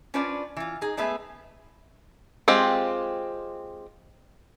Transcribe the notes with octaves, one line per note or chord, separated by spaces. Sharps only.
C#4 D4 F4 B4 C5 D5
E3 F4
D#4 G#4
G#3 A3 B3 G#4 B4 E5
G#3 C4 F4 G4